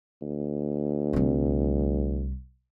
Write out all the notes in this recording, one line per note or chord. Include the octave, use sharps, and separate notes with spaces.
D2
C2 G3